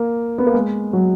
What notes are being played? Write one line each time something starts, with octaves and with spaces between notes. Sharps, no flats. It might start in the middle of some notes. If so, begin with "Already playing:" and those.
Already playing: A#3
B3
A#3
G#3
F#3